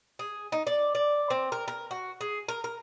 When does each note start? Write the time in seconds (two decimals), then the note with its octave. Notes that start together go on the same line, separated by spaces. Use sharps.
0.19 G#4
0.52 D#4
0.67 D5
0.95 D5
1.30 C4
1.52 A#4
1.68 A#4
1.91 F#4
2.21 G#4
2.48 A#4
2.64 A#4